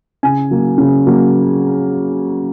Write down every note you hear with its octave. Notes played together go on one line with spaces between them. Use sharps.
C#3 G#5
F#3 A#3
C#3
F#3 A#3